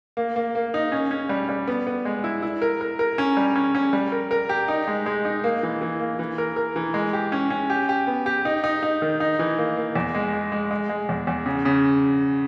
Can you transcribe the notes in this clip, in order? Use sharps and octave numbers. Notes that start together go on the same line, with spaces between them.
A#3
A#3
A#3
D#4
C#4
C#4
G3
G3
B3
B3
G#3
E4
E4
A#4
A#4
A#4
C#4
G3
C#4
C#4
G3
A#4
A#4
G4
D#4
G#3
G#3
D#4
A#3
E3
E3
A#3
E3
A#4
A#4
E3
G#3
G4
C#4
C#4
G4
G4
B3
G4
D#4
D#4
D#4
D#3
D#4
E3
A#3
A#3
E2
G#3
G#3
G#3
G#3
G#3
E2
E2
C#3
C#3